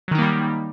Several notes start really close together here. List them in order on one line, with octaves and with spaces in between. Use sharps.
F#3 D#3 D#4 A#3 G3